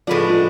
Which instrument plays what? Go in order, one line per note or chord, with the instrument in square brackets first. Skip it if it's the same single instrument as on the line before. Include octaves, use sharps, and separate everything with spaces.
[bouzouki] A2 G#3 B3 D4 [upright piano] F3
[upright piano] F3